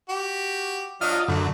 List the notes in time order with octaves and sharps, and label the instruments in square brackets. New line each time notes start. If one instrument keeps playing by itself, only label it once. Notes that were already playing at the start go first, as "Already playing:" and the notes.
[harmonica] F#4 G4
[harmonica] F#3 D4 F6 [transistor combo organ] F4 D#5
[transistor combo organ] F#2 D3 [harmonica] A3